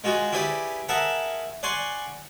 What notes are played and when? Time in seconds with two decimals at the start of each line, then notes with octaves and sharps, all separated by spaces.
0.04 G#3 F4 F#4 G#4
0.32 E4 G4 G#4 B4 D5
0.88 G#4 A#4 E5 F#5 A5 A#5
1.63 D5 F#5 G#5 C6 C#6